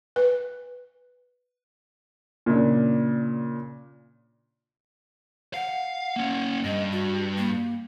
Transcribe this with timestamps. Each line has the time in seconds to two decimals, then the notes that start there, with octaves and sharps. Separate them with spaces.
0.16 B4
2.46 A#2 C#3 D4
5.54 F5 F#5
6.16 A#3 C#4
6.64 G2 D#5
6.92 F#4
7.37 A#3